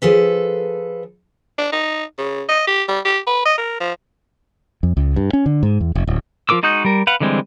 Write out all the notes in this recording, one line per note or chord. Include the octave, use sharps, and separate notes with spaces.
F3 G#4 A4 B4
D4
D#4
C#3
D#5
G4
G3
G4
B4
D#5
A#4
F3
F2
C#2
G2
C#4
D3
G#2
E2
F1
D1
F3 F4 A#4 D6 E6
G#3 D#4 F#4 D#6 G6
G3 A#4
B4 F5 F#5
D3 E3 G3 G#3 C4